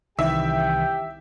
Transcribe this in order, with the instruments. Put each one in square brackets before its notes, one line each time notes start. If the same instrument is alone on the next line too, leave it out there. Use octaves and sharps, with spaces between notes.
[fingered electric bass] C2 [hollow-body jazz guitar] D#3 E3 [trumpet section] G4 G5 [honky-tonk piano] E5